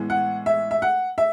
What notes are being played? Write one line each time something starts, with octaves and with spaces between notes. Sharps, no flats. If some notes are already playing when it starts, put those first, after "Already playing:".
Already playing: A2 E3 G#3 B3
F#5
E5
E5
F#5
E5